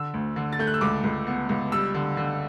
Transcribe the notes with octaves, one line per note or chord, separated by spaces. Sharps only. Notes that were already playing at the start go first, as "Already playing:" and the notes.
Already playing: D3 E6
D2
D3
A6
A3 G6
F#6
E6
C#2 D6
C#2
B3
C#2
G3 E6
D3
D3